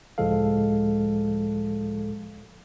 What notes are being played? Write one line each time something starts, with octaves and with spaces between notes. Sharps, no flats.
C#2 A2 F3 G#3 A4 F5